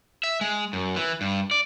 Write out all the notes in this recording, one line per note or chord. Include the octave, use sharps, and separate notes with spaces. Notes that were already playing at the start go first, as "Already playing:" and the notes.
E5
G#3
F#2
E3
G2
D5